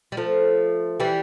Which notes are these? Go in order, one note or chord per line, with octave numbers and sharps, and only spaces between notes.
G3
F3 A3
E3 G3